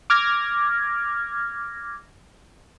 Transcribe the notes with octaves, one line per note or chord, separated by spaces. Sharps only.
D6 F6 G#6 A#6